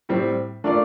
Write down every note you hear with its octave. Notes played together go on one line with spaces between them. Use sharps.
A2 G3 C4
A3 D4 F4 A#4 D5